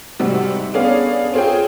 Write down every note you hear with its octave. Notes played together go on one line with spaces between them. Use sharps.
G#2 C3 G3 F#4
B3 C#4 D4 G#4 D5 F5
C4 F4 G#4 C#5 G5